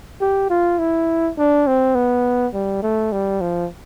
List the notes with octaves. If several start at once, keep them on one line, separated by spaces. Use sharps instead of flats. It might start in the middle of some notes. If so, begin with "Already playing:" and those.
G4
F4
E4
D4
C4
B3
G3
A3
G3
F3